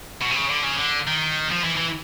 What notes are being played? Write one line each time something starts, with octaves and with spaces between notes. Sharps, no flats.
B2
C3
C#3
D3
C#3
D3
D#3
F3
E3
E3